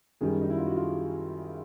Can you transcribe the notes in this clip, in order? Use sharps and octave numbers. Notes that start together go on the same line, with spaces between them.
F#2 D#3 G3 G#4
D#4
E4
F4
F#4
F4